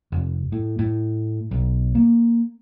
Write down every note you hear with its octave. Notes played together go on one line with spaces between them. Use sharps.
F1
A2
A2
B1
A#3